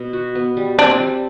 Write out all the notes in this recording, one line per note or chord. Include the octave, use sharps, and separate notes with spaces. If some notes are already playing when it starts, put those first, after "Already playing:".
Already playing: B2 B3
F#4
B3
G3
C4 D4
G3